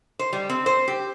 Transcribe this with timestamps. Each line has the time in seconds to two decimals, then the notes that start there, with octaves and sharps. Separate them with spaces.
0.19 C5
0.33 G3
0.50 C4
0.66 C5
0.88 G4